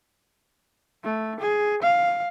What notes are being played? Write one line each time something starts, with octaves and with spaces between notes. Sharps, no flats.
A3
G#4
F5